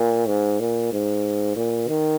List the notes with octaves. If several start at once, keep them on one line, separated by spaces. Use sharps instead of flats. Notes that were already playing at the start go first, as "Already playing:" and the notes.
Already playing: A#2
G#2
A#2
G#2
A#2
D#3